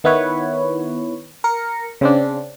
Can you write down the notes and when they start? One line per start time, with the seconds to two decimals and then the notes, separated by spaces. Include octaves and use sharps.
0.04 D#3 B3 E4 B4 C#5
1.44 A#4 A#6 C#7
2.01 C#3 C4 D4